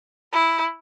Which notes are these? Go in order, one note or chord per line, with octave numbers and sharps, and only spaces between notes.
E4